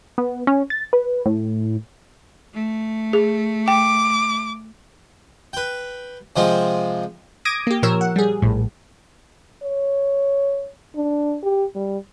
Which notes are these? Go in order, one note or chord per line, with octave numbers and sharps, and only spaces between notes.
B3
C#4
A6
B4
A2
A3
G#4
G5 D6
B4 G5
C3 F3 G#3 C4 F4
D6 D#6 G#6 A#6 D7 D#7
A#3 G4
A#2 F3 A#4 C#5 E6
F#5
G3 G#4
A#1 A2
C#5
D4
G4
G3